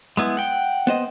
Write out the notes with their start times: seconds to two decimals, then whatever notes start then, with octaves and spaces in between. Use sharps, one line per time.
0.17 G#3 B3 E4
0.37 F#5 G5
0.87 B3 C5 D#5